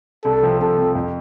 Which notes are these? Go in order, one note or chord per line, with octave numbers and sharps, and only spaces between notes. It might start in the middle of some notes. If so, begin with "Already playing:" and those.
C2 A4
C3 F3 C4
C2 A4
C3 F3 C4
F2